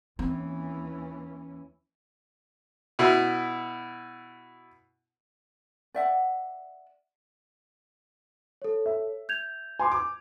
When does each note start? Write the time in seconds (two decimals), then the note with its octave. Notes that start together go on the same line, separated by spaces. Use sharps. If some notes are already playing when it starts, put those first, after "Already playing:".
0.19 D#2 E3 C4 C#4
2.99 B2 E4
5.94 D5 E5 F#5
8.62 A4 C#5
8.86 E5
9.29 G6 G#6 F7
9.79 G#5 C6 D6
9.92 D6